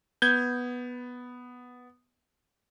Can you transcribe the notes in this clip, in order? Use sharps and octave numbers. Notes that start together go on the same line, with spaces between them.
B3 G6 G#6